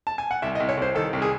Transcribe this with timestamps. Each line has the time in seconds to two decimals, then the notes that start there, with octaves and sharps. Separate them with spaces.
0.07 A5
0.18 G#5
0.31 F#5
0.42 C2 E5
0.55 D#5
0.60 C2
0.69 C#5
0.77 C2 C5
0.95 D#3 A4
1.13 C2
1.22 G#4